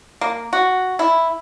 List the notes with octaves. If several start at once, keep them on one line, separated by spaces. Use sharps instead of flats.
A#3
F#4
E4